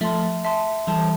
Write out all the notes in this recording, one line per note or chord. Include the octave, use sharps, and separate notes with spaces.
F3 A3 E5 A5 C6
E5 A5 C6
E3 G3 A4 E5 A5 C6